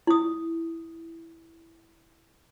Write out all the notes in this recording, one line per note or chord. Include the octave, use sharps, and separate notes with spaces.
E4 D#6